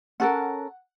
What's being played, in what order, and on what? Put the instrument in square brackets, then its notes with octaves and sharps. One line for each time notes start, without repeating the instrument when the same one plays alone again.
[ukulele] C#4 A4 A#4 [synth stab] F#5